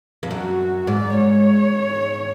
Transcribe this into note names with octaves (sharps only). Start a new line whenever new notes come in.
F2
F#2 F#4
G#2 D5
C#5